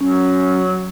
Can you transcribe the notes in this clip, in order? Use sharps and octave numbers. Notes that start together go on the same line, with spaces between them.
F#3 C#4